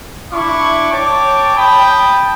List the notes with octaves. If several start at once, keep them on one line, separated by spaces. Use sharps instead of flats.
D4 E4 C#6 D6
C#5 G5 A5 D6
G5 A5 B5 D#6